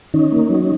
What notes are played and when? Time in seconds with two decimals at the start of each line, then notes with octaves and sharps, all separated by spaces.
0.14 D#3 C#4 D#4
0.32 A#3
0.49 F#3